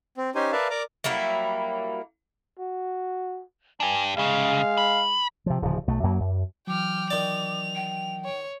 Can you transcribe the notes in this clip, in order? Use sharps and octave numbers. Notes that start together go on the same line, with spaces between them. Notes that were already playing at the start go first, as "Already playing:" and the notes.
C4
C#4 D#4 G4 C5 G#5
A#4 B4 D5 E5 F5 A5
A#4 D5 A#5 D6
F#3 G3 A#3 E4
F#4
D4 G4 G#5
C2 C#3 G#3 F5
B5
C3 F3
D1 C#3 F3
B1 A3
F#2 F#3 A#3
F#2
E3 F#3 G5 D6 F6
D#3 D5 F7
G5
C#5